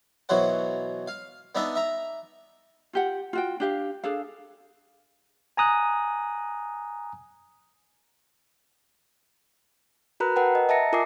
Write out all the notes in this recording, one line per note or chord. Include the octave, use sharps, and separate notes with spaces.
B2 E3 F#3 C5 F#5
F5
B3 D4 D#4 E5
E5 A#5
F4 G4 F#5
F4 F#4 G5
D4 G4 F5
D4 G#4 A4 F5
G#5 A#5 D#6 F#6
F#4 A#4 B4 A#5 B5 F#6
A#4 B4 F#5 G5 A5 A#5
D#5
D#5 E5 A5 A#5 A#6 C#7
F4 A#4 G#5 D6 D#6 C7